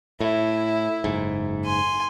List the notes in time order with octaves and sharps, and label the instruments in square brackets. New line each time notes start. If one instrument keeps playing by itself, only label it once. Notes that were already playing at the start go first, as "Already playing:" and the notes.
[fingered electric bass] A2 [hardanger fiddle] E4
[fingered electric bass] F#1 G#2
[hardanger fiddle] G#5 C6